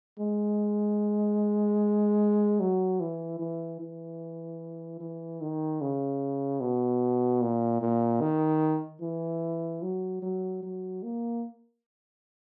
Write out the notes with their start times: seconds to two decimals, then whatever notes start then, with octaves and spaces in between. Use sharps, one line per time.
0.19 G#3
2.60 F#3
3.00 E3
3.39 E3
3.80 E3
5.00 E3
5.41 D#3
5.81 C#3
6.60 B2
7.42 A#2
7.81 A#2
8.21 D#3
9.01 E3
9.82 F#3
10.22 F#3
10.63 F#3
11.03 A#3